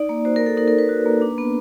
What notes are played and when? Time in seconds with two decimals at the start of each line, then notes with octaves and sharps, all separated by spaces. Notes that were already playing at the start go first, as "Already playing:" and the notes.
Already playing: D#4 D5
0.09 A#3
0.25 F#4 C5
0.36 A#4
0.41 A#3
0.46 A4
0.57 D#4 A#4
0.68 A#4
0.73 A#3
0.78 B4
0.89 F#4
1.06 A#3
1.21 D4
1.38 B3